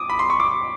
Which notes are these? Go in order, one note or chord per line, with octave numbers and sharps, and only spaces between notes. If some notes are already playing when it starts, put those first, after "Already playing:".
Already playing: D6 D#6
B5
C6
C#6
D6